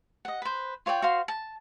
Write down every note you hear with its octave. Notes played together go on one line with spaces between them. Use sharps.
D#5 F#5
B4 C5
F4 C#5 D5 G5
F#4 C5 F5 C6
A5